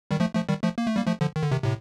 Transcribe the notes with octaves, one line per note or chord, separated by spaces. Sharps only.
D#3 G3
F3 A3
F3 A3
D#3 G3
F3 A3
A#3
A3
G3 A#3
F3 A3
D3 F3
D#3
D3
C3 D#3
A2 C3